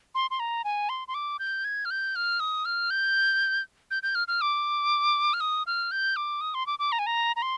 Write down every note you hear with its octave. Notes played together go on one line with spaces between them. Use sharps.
C6
C6
A#5
G#5
C6
C6
D6
G6
G#6
F6
G6
F6
D#6
F6
G6
G6
G6
F6
F6
D6
F6
D#6
F6
G6
D6
D#6
C6
D6
D6
A#5
G#5
A#5
A#5
C6